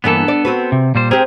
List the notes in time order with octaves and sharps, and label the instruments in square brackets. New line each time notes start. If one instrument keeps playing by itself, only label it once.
[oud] G2 E3 A#3 [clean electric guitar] B3 A4
[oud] D5
C4 F#4 B4
[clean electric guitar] C3
A#2 G3 C5
[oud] C4 G4 [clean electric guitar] G#4 A#4